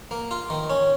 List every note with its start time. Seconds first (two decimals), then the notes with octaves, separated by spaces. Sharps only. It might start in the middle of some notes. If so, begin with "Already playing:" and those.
0.11 A#3
0.31 F4
0.50 D#3
0.70 C#4